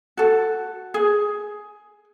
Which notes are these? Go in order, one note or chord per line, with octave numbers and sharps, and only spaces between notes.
F#4 A4
G#4